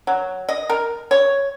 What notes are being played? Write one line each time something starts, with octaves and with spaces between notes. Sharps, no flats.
F#3
D#5
A#4
C#5